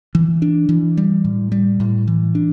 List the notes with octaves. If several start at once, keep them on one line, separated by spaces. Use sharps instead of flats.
E3
D4
E3
G3
A2
G3
A2
E3
D4